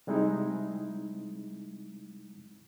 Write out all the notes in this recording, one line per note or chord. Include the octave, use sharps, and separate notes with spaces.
C3 G3 G#3 C4 D#4 E4